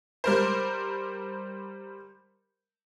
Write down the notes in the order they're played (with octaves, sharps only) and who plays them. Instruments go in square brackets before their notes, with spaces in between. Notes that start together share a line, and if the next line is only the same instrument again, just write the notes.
[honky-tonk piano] G3 A#4 C5